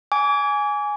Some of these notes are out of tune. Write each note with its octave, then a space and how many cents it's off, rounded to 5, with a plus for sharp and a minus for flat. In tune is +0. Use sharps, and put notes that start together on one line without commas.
G#5 +0 D6 -35